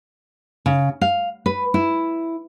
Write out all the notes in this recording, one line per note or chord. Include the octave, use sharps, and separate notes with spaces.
C#3
F5
B4
E4